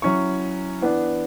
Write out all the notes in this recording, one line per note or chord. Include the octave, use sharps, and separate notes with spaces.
F#3 C#4 E4 C#6
E3 B3 D4